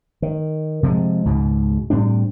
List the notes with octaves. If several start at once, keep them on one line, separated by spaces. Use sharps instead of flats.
D#3
C3 F3 F#3 G#3
C#2 G#2 B2
A2 G3 C4 D4